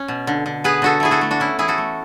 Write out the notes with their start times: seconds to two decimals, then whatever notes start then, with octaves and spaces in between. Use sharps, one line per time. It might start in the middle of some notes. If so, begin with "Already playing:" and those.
Already playing: C#4
0.08 B2
0.27 D3
0.46 D3
0.64 B3 G#4 B4
0.82 D3 F#4 A4
1.00 A3 E4 G#4
1.11 F#4 A4
1.21 A3
1.31 D4 F#4
1.40 C#4 E4
1.59 E3 E4 G#4
1.68 F#4 A4
1.78 A3